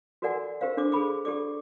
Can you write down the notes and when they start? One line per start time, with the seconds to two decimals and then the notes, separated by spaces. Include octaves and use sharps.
0.22 F#4 A4 A#4 D5 F#5 G#5
0.61 G4 A#4 C5 F5
0.77 D4 A4 C5 D6
0.92 G#4 A4 B5 D6
1.25 G4 A4 D5 D6